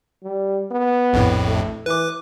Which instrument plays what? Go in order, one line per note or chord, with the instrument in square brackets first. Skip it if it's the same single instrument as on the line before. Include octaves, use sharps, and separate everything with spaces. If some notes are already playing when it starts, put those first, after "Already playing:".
[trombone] G3
B3
[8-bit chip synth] A#1 F2 A2
[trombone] A3
[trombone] E3 [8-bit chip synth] B4 D6